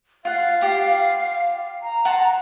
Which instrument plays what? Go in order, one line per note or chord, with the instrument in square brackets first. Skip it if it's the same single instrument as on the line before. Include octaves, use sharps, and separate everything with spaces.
[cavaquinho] F4 F#5 [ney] F5
[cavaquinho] F4 G4 F#5
[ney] A#5
[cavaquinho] F#5 A5 C6